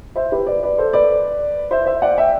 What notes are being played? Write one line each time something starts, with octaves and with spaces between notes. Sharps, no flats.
C5 E5
G4 B4
B4 D5
B4 D5
A4 C5
B4 D5
C5 E5
C5 E5
D5 F#5
E5 G5